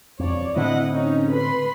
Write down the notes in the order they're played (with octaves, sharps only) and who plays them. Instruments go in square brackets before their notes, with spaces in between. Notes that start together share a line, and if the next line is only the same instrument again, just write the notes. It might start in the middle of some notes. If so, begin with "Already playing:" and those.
[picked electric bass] E1 F2 [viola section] C#5 D5
[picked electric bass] A2 D3 C4 [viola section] E4 D#5 F#5
[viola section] C#4 D#4
B4 B5 C6